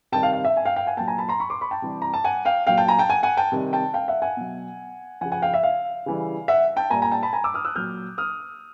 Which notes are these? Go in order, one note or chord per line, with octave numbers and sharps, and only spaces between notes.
C3 D#3 G3 G5 A5
F5 G5
F5
E5
G#5
F5 G5
F5 G5
F#5 G#5
A#2 F#3 G5 A5
G#5 A#5
A5 B5
A#5 C6
B5 C#6
C6 D6
B5 C#6
G5 A5
C3 E3 G3
A#5
A5
F#5 G#5
F5 G5
A#2 F#3 F5 G5
G5 A5
G#5 A#5
G5 A5
F#5 G#5
F#5 G#5
G5 A5
C3 D#3 G3
G5 A5
F5 G5
E5 F#5
F#5 G#5
B2 F#3
C#3 F3 F#5 G#5
F#5 G#5
F5 G5
E5
F5
C#3 E3 G3
E5 F#5
G5 A5
A#2 G3 G#5 A#5
G#5 A#5
G5 A5
A5 B5
G#5 A#5
D6 E6
D#6 F6
E6 F#6
A#2 F#3 F6 G6
D#6 F6